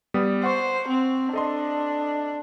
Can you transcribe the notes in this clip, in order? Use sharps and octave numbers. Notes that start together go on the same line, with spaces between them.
G3 B3 D#6
C5 F#5 C#6
C4
D4 A4 D#5 C6